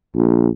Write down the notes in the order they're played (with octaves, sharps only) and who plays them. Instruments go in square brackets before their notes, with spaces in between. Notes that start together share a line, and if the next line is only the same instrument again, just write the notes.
[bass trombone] A#1